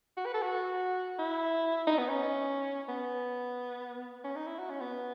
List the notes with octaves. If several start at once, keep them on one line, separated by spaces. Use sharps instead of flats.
F#4
B4
A4
F#4
E4
D#4
B3
C#4
B3
C#4
D#4
E4
F#4
C#4
B3